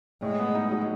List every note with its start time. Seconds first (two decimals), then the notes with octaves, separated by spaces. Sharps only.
0.22 A2 G#3
0.39 B3
0.55 D#4
0.72 F#3